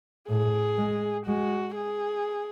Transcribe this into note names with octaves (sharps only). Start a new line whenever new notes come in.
A2 G#4
G#3
G#3 F#4
G#4